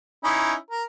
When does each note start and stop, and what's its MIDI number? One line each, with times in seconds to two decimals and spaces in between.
0.24 0.54 61
0.24 0.54 63
0.24 0.54 64
0.71 0.83 70